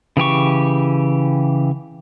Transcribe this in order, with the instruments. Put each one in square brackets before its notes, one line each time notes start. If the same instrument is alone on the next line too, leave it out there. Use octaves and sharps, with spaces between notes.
[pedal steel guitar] C#3 E3 G4 C#6